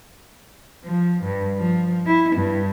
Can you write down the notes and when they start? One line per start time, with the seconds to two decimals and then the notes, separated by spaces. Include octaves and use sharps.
0.84 F3
1.23 G2
1.58 F3
2.06 E4
2.36 G2